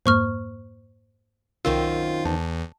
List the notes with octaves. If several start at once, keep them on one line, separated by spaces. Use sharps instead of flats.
F2 G#2 A#3 C5 C#6 F6
C2 F#2 D#3 C4 F4 E6
E2 A5